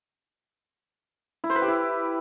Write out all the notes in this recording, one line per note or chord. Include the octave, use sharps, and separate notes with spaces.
E4
C5
B4
G4
E4